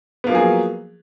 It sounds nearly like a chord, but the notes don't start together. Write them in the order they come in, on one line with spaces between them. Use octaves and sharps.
B3 A#3 F3 F#3 G#4